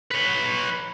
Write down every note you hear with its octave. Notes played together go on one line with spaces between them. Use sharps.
B4 C#5